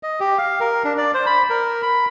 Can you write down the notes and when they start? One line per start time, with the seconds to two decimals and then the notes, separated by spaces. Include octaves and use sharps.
0.03 D#5
0.20 G4
0.38 F5
0.60 A#4
0.84 D4
0.98 D5
1.14 C5
1.26 B5
1.50 A#4
1.82 B5